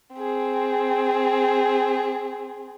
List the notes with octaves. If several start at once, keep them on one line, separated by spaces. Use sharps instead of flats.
C4 G#4